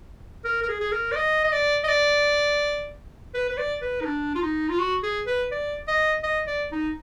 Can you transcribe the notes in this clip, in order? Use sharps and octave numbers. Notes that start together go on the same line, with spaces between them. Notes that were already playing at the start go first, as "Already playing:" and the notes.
A#4
A#4
G#4
G#4
A#4
D5
D#5
D#5
D5
D#5
D5
B4
B4
D5
B4
D#4
D4
F4
D#4
F4
F#4
G#4
B4
D5
D#5
D#5
D5
D#4